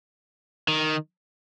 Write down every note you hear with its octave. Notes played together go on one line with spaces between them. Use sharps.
D#3